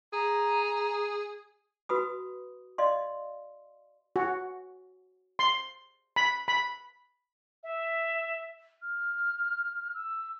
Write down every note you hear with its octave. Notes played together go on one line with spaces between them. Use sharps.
G#4 A#5
F#4 B4 B5 D#6
D5 D#5 F5 C6
F#4
C6
B5
B5
E5
F6
E6